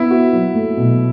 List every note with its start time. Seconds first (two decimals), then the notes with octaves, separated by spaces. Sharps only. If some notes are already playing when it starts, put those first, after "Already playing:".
Already playing: B3 E4
0.11 F#4
0.33 F#3
0.54 A3
0.77 B2